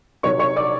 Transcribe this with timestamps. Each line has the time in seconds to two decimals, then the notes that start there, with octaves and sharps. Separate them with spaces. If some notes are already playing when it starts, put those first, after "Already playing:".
0.23 C3 D#3 F#3 C#5 C#6
0.39 C#5 C#6
0.56 D5 D6